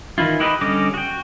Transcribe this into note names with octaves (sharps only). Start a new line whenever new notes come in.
D#3 E3 E4 F4
D#4 E4 G4 B4 D#5
D3 G3 C#4 D#5 D6
F#4 G5